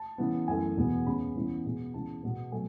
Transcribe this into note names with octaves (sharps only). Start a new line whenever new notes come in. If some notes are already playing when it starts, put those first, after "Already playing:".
Already playing: A5
C#3 E3 B3
F#2 E3 A3 G#5
E2 B2 G#3 B3
C#3 G#3 B3 B5
C#3 E3 G#3 B3
B2 G#3 B3
C#3 E3 G#3 B3 A5
B2 G#3 B3
B2 F#3 A3 G#5